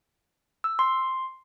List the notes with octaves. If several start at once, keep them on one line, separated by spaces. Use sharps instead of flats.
E6
C6